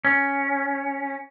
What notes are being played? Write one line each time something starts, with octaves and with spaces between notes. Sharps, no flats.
C#4